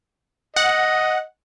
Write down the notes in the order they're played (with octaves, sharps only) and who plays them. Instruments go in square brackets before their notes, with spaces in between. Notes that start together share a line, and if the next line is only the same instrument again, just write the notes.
[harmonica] D#5 [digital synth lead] F#5